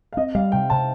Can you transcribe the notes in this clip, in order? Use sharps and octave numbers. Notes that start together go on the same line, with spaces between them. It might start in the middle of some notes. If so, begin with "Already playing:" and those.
F5
C4 D#5
G3 F5
C3 G5
C3 A5